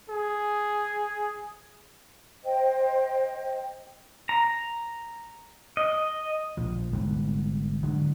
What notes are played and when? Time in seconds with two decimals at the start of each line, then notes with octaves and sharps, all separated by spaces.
0.10 G#4
2.43 C5 D#5 G5
4.29 A#5
5.77 D#5
6.57 A#1 F3
6.92 G1 G#2 C3 E3
7.83 D3 F#3 G#3